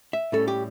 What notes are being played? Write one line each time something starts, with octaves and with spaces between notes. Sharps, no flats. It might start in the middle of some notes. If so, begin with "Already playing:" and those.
E5
A2 G3 C#4 A4
G4